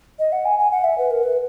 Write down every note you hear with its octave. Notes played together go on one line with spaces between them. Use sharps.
D#5
F#5
G#5
G#5
F#5
E5
B4
A#4
B4